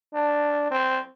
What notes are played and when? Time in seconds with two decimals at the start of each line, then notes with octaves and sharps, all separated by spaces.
0.14 D4
0.71 C4